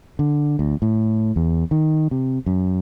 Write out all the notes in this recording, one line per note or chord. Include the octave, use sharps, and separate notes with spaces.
D3
D2
A2
E2
D#3
C3
F#2